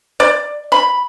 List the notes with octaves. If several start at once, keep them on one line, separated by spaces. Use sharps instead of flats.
D5
B5